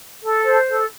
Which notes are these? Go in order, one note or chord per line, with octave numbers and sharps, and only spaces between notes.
A4
C5
A4